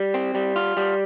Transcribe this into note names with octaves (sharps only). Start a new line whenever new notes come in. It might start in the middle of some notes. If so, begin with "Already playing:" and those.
Already playing: G3
C4
G3
F4
G3